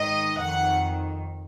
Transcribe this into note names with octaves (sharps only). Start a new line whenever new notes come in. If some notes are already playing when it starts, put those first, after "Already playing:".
Already playing: G#2 D#3 D#5
F2 D#3 F#5